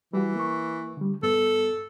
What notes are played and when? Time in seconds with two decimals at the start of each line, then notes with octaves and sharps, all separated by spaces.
0.13 E3 G3 F#4
0.36 A#3 C#6
0.97 D3 G3
1.23 G2 B3 A4